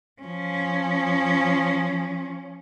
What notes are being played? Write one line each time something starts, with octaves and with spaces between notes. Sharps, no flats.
F3 C#4